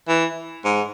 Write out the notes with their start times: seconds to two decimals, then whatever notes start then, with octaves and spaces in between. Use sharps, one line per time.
0.08 E3
0.65 G#2